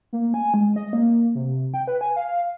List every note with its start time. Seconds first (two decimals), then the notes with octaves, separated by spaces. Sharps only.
0.13 A#3
0.34 G#5
0.54 G#3
0.76 D#5
0.93 A#3
1.35 C3
1.74 G5
1.88 B4
2.01 G#5
2.16 F5